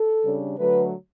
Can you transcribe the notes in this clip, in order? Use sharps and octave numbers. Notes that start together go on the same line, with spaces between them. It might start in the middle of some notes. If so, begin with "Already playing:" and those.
Already playing: A4
C#3 G3 D4
D3 F#3 A3 B4